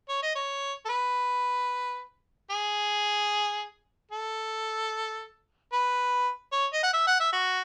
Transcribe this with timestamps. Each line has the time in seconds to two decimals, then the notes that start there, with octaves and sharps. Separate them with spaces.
0.09 C#5
0.23 D#5
0.35 C#5
0.85 A4
0.89 B4
2.51 G#4
4.11 A4
5.73 B4
6.52 C#5
6.73 D#5
6.83 F#5
6.93 E5
7.07 F#5
7.20 E5
7.33 F#4